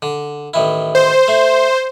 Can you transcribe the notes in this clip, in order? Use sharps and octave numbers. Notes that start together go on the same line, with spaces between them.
D3
A1 D#3 E4
C5
A3